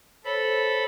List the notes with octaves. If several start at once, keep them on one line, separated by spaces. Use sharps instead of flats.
A4 C5 C#5 B5